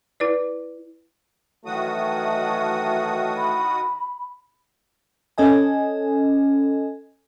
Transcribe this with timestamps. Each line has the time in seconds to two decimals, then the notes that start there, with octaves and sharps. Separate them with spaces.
0.20 E4 B4 D5
1.66 D#3 E3 F#3 A3 F#4 D#6
3.37 B5
5.38 C#4 A4 D#5 G#5